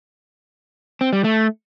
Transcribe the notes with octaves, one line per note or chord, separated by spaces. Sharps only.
C4
G3
A3